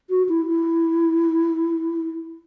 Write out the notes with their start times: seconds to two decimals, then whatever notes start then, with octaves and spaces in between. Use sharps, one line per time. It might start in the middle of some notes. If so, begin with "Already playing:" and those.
0.10 F#4
0.29 E4
0.48 E4